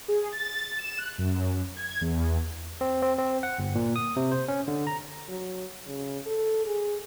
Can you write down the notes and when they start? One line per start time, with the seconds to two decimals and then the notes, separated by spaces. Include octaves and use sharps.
0.08 G#4
0.32 A6
0.78 E7
0.98 F#6
1.18 F#2
1.77 G#6
2.01 E2
2.81 C4
3.02 C4
3.18 C4
3.43 F#5
3.59 G1
3.75 A#2
3.96 D#6
4.16 C3
4.32 C5
4.48 C#4
4.68 D3
4.87 A#5
5.29 F#3
5.87 C#3
6.27 A4
6.65 G#4